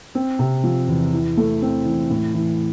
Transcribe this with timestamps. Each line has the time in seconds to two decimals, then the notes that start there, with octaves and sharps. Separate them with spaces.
0.15 C4
0.39 C3
0.64 F3
0.88 E2
1.13 E4
1.37 A3
1.62 C4
1.85 E3
2.10 A2
2.35 E3